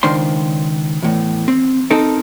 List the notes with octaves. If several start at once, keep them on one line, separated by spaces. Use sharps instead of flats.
C#2 D#3 D4 C5 C6
E2 A2
C4
C4 D#4 A4 A#4